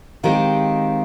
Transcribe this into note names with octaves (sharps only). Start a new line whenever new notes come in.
D#3 G#3 C4 G4 F5